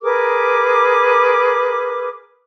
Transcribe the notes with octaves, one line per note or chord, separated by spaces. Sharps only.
G#4 A#4 B4 D6